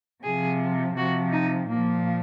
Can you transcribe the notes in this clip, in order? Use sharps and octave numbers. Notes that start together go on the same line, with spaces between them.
C3 F3 G#4
C3 F3 F#4
D#4
A#2 F3 A#3